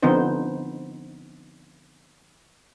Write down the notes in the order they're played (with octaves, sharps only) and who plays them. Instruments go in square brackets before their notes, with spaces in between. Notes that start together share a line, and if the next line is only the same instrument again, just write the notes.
[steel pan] D3 F3 B3 C4 D#4 C5